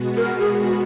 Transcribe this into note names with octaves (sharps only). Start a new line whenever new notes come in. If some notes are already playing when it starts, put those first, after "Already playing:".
Already playing: B2 G#3 B3 F#4
A#4
G#4
F#4